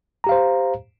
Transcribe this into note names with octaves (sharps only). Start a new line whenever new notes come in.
G4 C5 F5 A#5